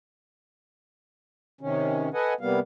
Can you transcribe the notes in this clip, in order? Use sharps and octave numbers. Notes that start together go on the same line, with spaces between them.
C3 D#3 C#4
A4 B4 D#5 F#5 G#5
C3 G3 A#3 B3 F5